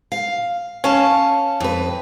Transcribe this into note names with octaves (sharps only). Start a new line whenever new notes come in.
F5
C#4 F5 A5
F2 B4